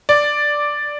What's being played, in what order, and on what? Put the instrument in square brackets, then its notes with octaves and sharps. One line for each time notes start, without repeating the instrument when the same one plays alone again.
[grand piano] D5